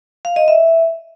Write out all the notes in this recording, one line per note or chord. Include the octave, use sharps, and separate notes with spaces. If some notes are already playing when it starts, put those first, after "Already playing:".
F5
D#5
E5